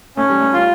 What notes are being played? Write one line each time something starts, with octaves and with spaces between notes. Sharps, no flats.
A3 C#4
G3
A3
G3 F4